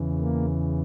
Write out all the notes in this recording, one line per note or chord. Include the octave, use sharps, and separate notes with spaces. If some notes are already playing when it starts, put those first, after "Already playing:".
Already playing: E2 C#3 E3
A#3